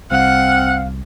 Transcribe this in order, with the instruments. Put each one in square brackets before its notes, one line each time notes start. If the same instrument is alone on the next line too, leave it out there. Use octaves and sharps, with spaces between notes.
[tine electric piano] C2 [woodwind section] C4 F5 [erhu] F#5